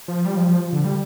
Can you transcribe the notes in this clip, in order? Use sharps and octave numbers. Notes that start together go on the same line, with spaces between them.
F3
G3
F3
F3
D3
G3